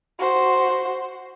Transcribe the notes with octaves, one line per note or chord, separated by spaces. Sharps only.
F#4 C5